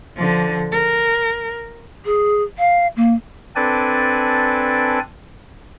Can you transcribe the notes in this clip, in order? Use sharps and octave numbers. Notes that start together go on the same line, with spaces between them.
D3 F3
A#4
G#4
F5
A#3
C4 D4 A4 B4 D5 G#5